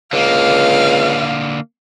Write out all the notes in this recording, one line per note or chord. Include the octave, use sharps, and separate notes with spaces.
C#2 D3 A#3 F5